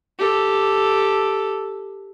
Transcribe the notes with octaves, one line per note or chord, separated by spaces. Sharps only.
G4 A4